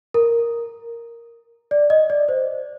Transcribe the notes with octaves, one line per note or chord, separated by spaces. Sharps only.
A#4
D5
D#5
D5
C5